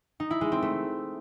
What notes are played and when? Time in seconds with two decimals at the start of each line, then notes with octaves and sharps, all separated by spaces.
0.20 D#4
0.30 E4
0.41 G#3
0.52 C4
0.62 A3